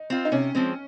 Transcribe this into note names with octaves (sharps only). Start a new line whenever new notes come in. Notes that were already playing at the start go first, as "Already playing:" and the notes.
Already playing: D#4
C4 F4
D#4
C3 C#4
F3 G#3 C4